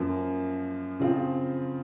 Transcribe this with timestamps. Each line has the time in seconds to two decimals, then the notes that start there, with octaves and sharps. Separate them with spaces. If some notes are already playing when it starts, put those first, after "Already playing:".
Already playing: F#2 F3 A#3
1.00 C#3 F3 C4 F4